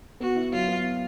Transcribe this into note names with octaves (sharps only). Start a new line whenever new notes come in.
B3 F#4
E4
F#3 F4
B3